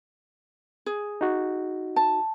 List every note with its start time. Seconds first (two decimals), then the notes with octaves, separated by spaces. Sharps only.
0.86 G#4
1.21 D#4 F#4
1.96 A5